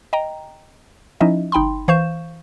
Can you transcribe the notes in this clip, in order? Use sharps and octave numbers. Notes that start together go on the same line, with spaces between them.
D#5 G5 A#5
F3 C#4 D#4 E4 D#5 E5
G1 D#4 G5 B5 C6
E3 C5 F5 C#6 G6 E7